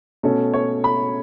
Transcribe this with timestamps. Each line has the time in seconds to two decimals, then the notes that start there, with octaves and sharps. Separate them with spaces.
0.23 B2 A3 C#4 A4
0.54 C#5
0.84 B5